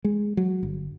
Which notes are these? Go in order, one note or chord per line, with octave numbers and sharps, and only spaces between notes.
G#3
F#3
G1